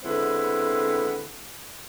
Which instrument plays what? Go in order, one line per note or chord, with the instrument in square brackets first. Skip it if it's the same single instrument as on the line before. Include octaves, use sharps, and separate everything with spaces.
[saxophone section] D3 G#3 B3 C4 E4